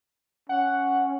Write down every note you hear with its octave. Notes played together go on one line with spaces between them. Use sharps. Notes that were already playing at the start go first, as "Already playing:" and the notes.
C#4 F#5